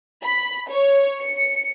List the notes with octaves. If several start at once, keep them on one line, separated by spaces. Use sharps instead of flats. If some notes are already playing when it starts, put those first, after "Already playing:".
B5
C#5
C#7